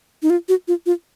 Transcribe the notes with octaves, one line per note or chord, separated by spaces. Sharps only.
D#4
F4
F#4
F4
F4